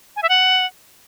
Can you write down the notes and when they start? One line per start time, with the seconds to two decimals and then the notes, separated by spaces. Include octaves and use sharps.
0.16 G#5
0.23 E5
0.29 F#5